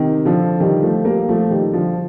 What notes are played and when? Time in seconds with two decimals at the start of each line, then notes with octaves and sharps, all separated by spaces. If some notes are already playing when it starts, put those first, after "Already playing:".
Already playing: C3 D#3
0.25 D3 F3
0.60 D#3 G3
0.82 F3 A3
1.05 G3 A#3
1.29 F3 A3
1.50 D#3 G3
1.74 D3 F3